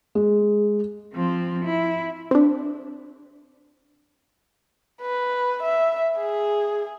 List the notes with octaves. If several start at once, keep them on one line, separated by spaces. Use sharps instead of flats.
G#3
F3 C4
E4
C4 D4
B4
E5
G#4